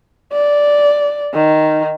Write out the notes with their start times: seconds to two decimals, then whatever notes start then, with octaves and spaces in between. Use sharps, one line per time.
0.33 D5
1.34 D#3